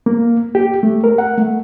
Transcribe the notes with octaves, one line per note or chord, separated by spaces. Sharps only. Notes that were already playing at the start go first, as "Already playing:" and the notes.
A#3
G4
A3
A#4
F#5
A3